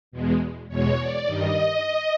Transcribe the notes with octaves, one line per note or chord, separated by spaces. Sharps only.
E2 B2 G#3
E2 B2 G#3 C#5
D5
G2 D#3 G3 D#5